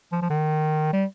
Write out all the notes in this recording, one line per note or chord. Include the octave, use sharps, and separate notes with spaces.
F3
F3
D#3
G3